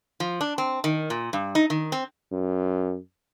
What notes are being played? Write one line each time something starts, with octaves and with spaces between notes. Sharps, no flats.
F3
D4
C4
D#3
A#2
G2
D#4
D#3
C4
F#2